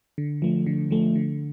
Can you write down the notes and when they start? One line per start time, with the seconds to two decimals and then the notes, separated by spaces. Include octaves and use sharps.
0.18 D3
0.42 F3 A3
0.66 D3
0.91 F3 A3
1.16 D3